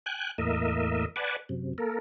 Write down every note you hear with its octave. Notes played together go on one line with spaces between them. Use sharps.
G5 G#5 F#6
E2 A2 A#3 A#4 D#5 E5
B4 D5 F#5 G#5 A5
F#2 C3
A#3 A4 A#4